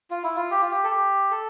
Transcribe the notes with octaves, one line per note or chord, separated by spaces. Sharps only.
F4
E4
F4
G4
F4
G4
A4
G4
A4